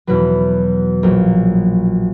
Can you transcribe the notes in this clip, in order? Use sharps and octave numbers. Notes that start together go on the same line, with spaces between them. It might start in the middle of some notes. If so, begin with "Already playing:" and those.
E2 B2 F#3 B4
A#1 A#2 F#3